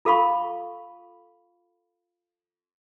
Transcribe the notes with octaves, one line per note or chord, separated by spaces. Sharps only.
F4 A4 F5 B5 C#6